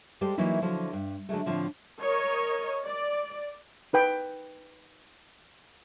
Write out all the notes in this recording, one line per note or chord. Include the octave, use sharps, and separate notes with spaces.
G3 G#3 G4 A4 C5
E3 F#3 A#3 D#4 E4
D3 F3 F#3 E4
G2
D3 F#3 G#3 A3
A2 D3 F3 C4
A#4 C#5 D#5
D5
D#4 B4 G5